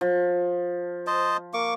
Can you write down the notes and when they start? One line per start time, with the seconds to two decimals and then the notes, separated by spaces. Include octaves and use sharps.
0.01 F3
1.07 C5 D#5 A5
1.54 A#3 C#6 D6